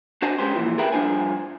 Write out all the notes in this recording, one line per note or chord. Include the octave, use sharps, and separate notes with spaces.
D4 F#4 C5 D#5 G#5 A5
G#3 C#4 G4 B4 C5
A#2 E3 F3
G4 G#4 A#4 B4 E5 G5
G2 F3 D4 F4 C5 G#5